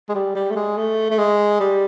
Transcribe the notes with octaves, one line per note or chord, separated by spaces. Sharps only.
G#3
G3
G3
A3
G#3
A3
A3
G#3
G3